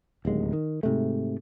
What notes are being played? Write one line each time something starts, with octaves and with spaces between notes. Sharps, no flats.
D1 D#2 G#3
D#3
G#2 C3 A3